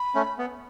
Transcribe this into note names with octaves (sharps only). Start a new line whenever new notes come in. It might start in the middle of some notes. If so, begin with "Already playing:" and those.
Already playing: B5
A3 C#4
B3